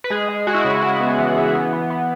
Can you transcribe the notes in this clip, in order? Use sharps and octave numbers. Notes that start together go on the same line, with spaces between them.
B4
G#3 G#4
G#3
G#3 F#4
E4
F#4
C#3
G#3 E4
B3
E3
E3
B3
B3
B3